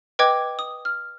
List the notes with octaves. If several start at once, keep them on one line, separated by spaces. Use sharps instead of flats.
B4 D#5 G5 D6 G#6
D#6
F6